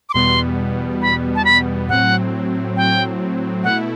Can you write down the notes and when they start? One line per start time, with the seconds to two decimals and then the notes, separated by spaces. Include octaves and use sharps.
0.09 D6
0.14 E2 B2 G3 B3 C6
1.02 B5
1.35 A5
1.45 B5
1.89 A2 F#3 C4 F#5
2.77 G5
3.64 B2 A3 E4 F#5